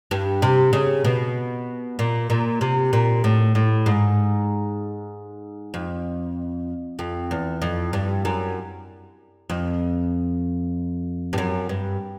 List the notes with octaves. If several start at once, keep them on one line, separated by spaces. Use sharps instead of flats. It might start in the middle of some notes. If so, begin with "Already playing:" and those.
G2
C3
C#3
B2
A#2
A#2
C3
A#2
A2
A2
G#2
F2
F2
E2
F2
G2
F#2
F2
G2
F#2
G2